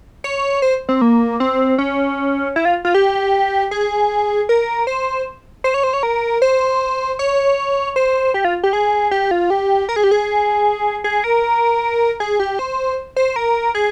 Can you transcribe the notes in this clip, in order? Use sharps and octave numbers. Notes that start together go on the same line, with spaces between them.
C#5
C5
C4
A#3
C4
C#4
E4
F4
F4
G4
G#4
A#4
C5
C5
C#5
C5
C#5
A#4
C5
C#5
C5
G4
F4
G4
G#4
G4
F4
G4
A#4
G#4
G4
G#4
G#4
A#4
G#4
G4
C5
C5
A#4
G#4